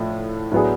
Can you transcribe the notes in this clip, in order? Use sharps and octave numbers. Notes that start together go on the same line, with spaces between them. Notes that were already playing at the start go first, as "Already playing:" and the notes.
Already playing: A2 F3 A3 D4
A2 F#3 B3 D4 G#4